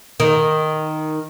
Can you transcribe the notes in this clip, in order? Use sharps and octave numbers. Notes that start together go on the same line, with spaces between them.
D#3